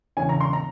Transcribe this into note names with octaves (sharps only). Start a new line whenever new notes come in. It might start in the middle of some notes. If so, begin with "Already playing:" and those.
E1 E2 C#3 G#5
A#5
C6
A#5